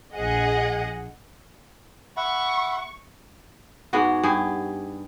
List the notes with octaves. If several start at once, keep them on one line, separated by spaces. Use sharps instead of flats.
A#1 G#4 D#5 F#5
E5 F#5 B5 C#6
G#2 G#3 B3 F#4
G2 G4 G#4